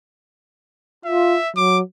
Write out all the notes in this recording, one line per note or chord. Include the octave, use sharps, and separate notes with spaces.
F4 E5
F#3 D6